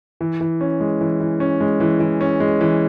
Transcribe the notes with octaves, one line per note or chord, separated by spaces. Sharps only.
E3
E3
C#4
G#3
E3
E3
C#4
G#3
E3
E3
C#4
G#3
E3